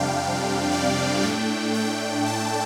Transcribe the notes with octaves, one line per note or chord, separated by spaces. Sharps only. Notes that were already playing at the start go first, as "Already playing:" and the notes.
Already playing: F2 C3 G3 D4 F5 G5
D5
A2 A3 D4 G5
G5
A5